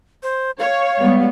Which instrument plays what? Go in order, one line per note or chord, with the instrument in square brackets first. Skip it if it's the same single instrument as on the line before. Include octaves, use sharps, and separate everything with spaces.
[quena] C5
[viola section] C#5 [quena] F5
[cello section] G3 G#3 B3